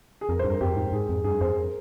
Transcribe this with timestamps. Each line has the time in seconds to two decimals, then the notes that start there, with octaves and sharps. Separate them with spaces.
0.21 G#4
0.29 F2 A#4
0.39 C5
0.44 G2
0.50 A#4
0.61 F2 G4
0.76 G#2
0.92 G#2 G#4
1.09 F2
1.24 G2 G#4
1.41 F2 C5
1.56 A#4